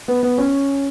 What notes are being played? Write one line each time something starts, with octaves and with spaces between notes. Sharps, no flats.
B3
B3
C#4